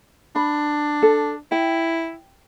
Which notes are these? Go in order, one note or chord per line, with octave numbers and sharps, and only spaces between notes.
D4 B5
A4
E4 G5